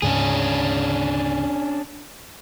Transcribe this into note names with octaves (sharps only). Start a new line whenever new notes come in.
D2 G#2 C#3 C#4 D4 G#4